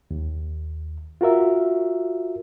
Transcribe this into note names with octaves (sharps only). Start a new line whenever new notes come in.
D#2
F4 F#4 A#4 E5